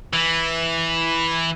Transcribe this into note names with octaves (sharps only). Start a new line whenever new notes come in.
E3